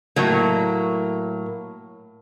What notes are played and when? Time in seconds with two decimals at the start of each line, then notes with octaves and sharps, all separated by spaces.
0.16 A2 F#3 A#3